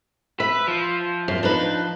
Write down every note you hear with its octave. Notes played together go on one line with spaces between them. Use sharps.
B4 E5
F3
F#2
D4 D#4 B4